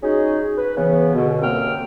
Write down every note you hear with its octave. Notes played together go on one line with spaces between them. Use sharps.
G#3 C#4 D#4 F#4 G#4
B4
C#3 E3 B3
C#2 B2 D3
C2 F#2 A#3 C4 G5 F6